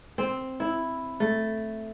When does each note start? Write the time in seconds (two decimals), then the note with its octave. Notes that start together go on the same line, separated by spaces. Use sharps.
0.18 C4
0.60 E4
1.20 A3